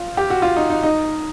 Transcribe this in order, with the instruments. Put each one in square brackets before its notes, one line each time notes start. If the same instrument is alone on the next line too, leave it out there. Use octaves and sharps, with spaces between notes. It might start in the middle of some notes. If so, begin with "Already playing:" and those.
Already playing: [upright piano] F4
G4
F#4
F4
D#4
D#4
D#4